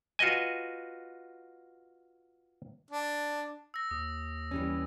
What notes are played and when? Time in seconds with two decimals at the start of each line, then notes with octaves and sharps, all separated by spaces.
0.19 F4 F#4 B4 D#5 G#5
2.91 D4
3.74 E6 A#6
3.91 D#2 D#6
4.51 E3 G3 C#4